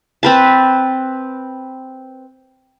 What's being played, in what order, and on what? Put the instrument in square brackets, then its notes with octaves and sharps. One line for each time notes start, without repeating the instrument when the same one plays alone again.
[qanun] C4 B4 A5